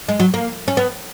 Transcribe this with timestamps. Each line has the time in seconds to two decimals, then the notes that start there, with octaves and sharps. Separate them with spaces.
0.09 G#3
0.20 F#3
0.34 A#3
0.68 C#4
0.77 B3